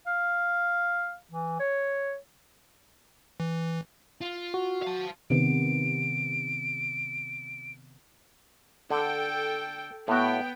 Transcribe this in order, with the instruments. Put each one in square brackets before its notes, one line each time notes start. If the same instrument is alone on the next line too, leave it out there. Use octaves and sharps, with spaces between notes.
[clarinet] F5
E3
C#5
[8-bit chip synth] E3
[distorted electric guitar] F4
[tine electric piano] F#4
[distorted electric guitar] F5 A5
[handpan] C3 D#3 B3 [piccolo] D7
[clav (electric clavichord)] D3 [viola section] A4 G5
[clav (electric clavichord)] A2 F#4 [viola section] B3 G5